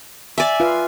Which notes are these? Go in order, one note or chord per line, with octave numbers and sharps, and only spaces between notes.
D5 E5 G#5
F4 B4 F5